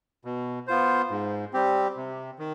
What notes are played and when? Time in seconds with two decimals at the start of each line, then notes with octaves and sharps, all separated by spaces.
0.25 B2
0.67 B3 F4 C5
1.11 G#2
1.53 G3 C4 G4
1.97 C3
2.39 D#3